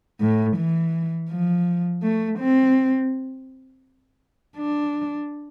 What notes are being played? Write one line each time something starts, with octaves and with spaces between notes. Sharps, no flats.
A2
E3
F3
A3
C4
D4